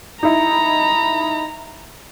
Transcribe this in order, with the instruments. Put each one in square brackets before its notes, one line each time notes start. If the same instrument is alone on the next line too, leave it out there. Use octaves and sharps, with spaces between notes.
[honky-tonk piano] D#4 E4 [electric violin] A#5 B5